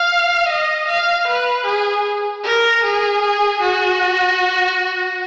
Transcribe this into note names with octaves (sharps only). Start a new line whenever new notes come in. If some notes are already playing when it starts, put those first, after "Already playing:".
Already playing: F5
D#5
F5
B4
G#4
A#4
G#4
F#4